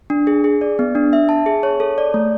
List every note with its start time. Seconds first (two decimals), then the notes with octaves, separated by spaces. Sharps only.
0.10 D4
0.27 G#4
0.44 G#4
0.61 D5
0.79 B3
0.95 D4
1.13 E5
1.29 A5
1.46 G#4
1.63 C#5
1.80 A4
1.98 D5
2.14 A3